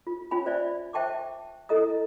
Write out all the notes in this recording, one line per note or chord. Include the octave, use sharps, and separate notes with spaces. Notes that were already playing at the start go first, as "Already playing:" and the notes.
F4
C#4 F4 C#5 G#5 B5
C5 D5 E5
C5 E5 G5 A5 C#6 D6
E4 A4 D#5 A#5 D#6